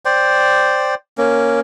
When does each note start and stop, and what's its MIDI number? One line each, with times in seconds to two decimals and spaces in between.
0.05 0.95 72
0.05 0.95 74
0.05 0.95 79
1.18 1.60 58
1.18 1.60 61